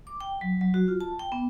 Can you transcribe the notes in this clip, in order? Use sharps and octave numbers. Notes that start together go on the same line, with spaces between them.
D6
G5
F#3
F#3
F#4
F4
A5
G5
B3